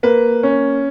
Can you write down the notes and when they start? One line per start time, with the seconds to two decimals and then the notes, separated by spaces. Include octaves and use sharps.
0.03 A#3 B4
0.43 C#4